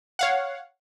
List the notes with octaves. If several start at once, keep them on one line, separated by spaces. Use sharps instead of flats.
C#5 F5 F#5